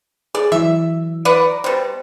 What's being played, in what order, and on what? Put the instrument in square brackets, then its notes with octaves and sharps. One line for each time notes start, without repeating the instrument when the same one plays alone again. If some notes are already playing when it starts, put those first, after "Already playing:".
[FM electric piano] G#4 [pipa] D5
[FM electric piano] E3 F#3 [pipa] E5
[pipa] B4 D5 F#5
[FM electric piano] A#5 D6
[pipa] B2 G3 [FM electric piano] C5